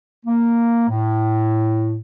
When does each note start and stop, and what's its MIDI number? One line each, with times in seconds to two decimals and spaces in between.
0.25 0.87 58
0.89 1.98 45